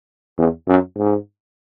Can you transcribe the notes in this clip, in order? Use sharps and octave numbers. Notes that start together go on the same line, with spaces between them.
E2
F#2
G#2